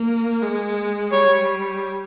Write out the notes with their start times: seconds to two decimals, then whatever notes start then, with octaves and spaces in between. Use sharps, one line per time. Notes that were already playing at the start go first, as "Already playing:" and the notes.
Already playing: A#3
0.42 G#3
1.12 G3 C#5